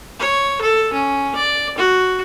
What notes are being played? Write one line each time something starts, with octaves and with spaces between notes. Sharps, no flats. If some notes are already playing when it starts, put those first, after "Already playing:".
C#5
A4
C#4
D5
F#4